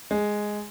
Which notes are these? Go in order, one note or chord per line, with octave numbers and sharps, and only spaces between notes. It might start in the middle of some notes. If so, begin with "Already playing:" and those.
G#3